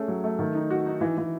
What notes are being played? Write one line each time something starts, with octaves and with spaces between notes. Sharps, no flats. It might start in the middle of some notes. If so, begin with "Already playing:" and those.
Already playing: A3 C#4 G#4
F#3
A3
D#3
D#4
F#4
D#4
E3
E3